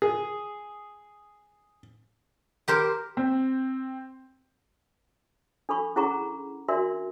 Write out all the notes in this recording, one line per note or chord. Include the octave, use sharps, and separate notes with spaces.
G#4
G4 A#4 C5
C4
D4 A4 B5 C#6
C#4 E4 G#4 F#5 A#5 C#6
D4 F#4 A#4 D5 E5 C6